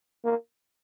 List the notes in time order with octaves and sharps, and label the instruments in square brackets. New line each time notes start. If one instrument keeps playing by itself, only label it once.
[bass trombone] A#3